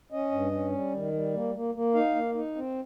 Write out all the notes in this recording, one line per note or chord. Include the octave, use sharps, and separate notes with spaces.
C#4 D#5
G2
C#4
G3
D#3
G3
A#3
A#3
A#3
D#4 F5
A#3
D#4
C4